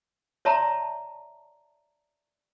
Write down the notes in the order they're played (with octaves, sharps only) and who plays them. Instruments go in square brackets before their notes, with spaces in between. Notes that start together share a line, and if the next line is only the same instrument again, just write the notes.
[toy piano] C#5 D5 E5 A5 A#5 C6